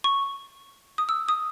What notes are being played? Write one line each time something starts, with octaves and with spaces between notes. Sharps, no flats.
C#6
D#6
E6
D#6